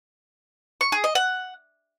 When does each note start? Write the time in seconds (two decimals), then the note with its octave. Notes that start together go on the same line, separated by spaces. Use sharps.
0.81 C#6
0.92 G#4
1.04 D#5
1.15 F#5